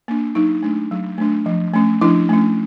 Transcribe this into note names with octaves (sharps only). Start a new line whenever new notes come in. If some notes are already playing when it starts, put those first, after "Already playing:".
A#3 D4
F#3 D#4
A3 D4
F#3
A3 D4
F3
A3 C#4
F3 D4 E4
A3 C#4